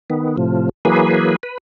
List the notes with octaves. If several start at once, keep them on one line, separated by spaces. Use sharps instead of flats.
D#3 B3
A2 C3 F3
E3 F#3 A#3 G#4 B4
B4